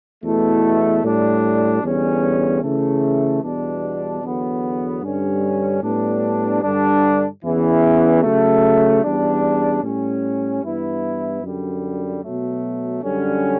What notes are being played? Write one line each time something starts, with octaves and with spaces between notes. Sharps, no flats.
E2 B2 A3 E4
A2 G3 D4
E2 D3 G3 C#4
C#3 E3 A3
E2 B2 G3 D4
E2 D3 F#3 B3
G2 D3 G3 C#4
A2 G3 B3 D4
G2 D3 G3 D4
E2 C#3 E3 B3
C#3 F#3 A3
E2 C#3 G3 D4
A2 G3 C#4
G2 E3 B3 E4
F#2 D3 G3
B2 F#3 A3
F#2 D3 G3 C#4